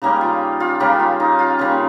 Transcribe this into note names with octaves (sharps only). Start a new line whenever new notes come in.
C#3 G3 A#3 C#4 D#4
F4
F4
C#3 G3 A#3 C#4 G4
F4
D#4
F4
C#3 G3 A#3 C#4